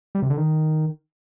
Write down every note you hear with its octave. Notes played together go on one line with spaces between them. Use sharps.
G3
C3
D3
D#3